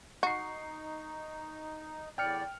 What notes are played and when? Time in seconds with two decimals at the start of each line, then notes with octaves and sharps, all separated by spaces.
0.23 D#4 F#4 C#6 C7
2.18 E2 A2 D5 G5 F6 C#7